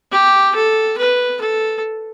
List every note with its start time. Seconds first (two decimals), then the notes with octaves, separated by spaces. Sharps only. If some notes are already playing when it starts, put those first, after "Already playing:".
0.12 G4
0.55 A4
0.98 B4
1.41 A4